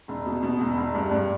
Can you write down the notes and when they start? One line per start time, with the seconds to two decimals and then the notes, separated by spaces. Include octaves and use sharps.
0.08 E1
0.26 B2
0.43 B2
0.60 E1
0.77 E1
0.95 G2
1.11 G2